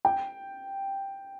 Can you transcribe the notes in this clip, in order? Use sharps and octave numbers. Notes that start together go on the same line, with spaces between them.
G5